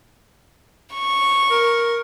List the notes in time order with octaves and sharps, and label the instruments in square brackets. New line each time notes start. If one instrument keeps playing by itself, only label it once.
[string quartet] C#6
[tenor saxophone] A#4